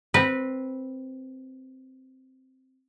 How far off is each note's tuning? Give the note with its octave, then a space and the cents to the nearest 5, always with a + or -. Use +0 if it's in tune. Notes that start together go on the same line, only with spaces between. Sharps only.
C4 +0 B4 -10